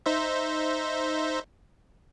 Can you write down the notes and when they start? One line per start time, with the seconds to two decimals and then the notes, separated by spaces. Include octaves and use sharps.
0.06 D#4 C5 E5